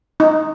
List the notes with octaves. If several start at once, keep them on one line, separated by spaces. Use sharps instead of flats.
D#4